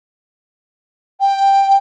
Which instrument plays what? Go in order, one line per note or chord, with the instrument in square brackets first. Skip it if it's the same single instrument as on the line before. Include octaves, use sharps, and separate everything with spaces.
[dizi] G5